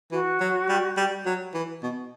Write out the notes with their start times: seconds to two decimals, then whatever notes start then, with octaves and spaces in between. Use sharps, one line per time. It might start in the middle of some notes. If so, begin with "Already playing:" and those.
0.12 E3 F#4
0.41 F#3
0.69 G3
0.97 G3
1.26 F#3
1.54 E3
1.83 B2